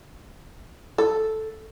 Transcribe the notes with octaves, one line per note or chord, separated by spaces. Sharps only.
A4